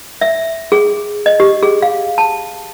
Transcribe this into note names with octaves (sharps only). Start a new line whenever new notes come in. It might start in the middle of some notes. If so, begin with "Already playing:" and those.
E5
G#4
D#5
G4
G#4
F5
A5